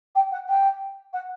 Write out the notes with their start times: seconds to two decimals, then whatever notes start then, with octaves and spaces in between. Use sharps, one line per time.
0.15 G5
0.31 F#5
0.48 G5
1.13 F#5